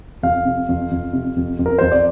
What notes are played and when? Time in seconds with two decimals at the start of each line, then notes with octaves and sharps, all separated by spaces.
0.23 F2 F5
0.45 C3
0.69 F2
0.91 F2
1.13 C3
1.36 F2
1.59 F2
1.66 A#4
1.79 F2 C5
1.92 D5